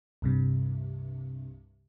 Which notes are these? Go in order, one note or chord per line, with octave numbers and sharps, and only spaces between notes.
C2 G2 C3